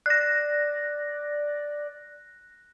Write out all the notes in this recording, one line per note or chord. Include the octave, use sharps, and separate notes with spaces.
D5 F#6 A#6